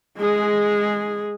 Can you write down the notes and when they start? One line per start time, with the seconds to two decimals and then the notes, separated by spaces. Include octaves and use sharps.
0.17 G#3 G#4